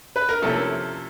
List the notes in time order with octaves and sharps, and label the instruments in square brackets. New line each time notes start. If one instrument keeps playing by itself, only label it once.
[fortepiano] B4
A#4
C3 F3 A#3 C#4 E4 A4